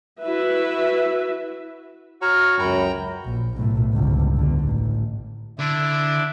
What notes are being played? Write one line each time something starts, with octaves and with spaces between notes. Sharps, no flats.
E4 F#4 B4 E5
F#4 C#5 A#5 F6
C#2 F#2 G5 A#5 B5
A#1
B1 A2
G1 C#2
E2 D3
A1
D3 D4 E4